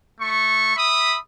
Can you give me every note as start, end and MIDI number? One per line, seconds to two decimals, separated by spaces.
0.21 0.74 57
0.21 0.74 85
0.77 1.17 76
0.77 1.17 83
0.77 1.17 87